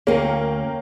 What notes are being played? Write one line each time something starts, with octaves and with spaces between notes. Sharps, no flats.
D2 A#3 C#4 C#5 G5 A#5